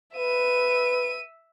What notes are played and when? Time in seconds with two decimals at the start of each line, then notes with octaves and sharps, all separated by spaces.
0.15 B4 E5 D#7